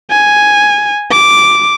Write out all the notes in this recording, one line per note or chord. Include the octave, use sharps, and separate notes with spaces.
G#5
D6